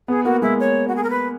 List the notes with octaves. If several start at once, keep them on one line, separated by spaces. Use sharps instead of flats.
B3 G#4
A#3 F#4
G#3 E4
C#5
F#4
G#4
A#4
B4